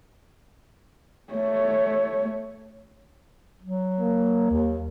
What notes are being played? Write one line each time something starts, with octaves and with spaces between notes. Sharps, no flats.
A3 C#5
F#3
A#3
D#2